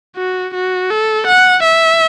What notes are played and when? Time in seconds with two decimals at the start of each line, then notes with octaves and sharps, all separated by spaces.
0.16 F#4
0.54 F#4
0.90 A4
1.27 F#5
1.63 E5